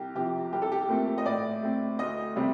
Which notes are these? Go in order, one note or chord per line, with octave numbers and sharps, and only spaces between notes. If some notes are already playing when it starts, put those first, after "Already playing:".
Already playing: C2 G4
C3 F3 G4
C2 G4
A4
G4
A#2 A3 C4
D#5
A2 D5
A3 C4
D2 D#5
C3 G3 C4